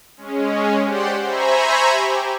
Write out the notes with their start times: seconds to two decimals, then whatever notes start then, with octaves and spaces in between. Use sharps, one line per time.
0.17 G#3 C#4
0.84 G4 C5 D5 F#5 G5 C6
1.22 C5 E5 G#5 A#5 B5 C#6
1.91 G4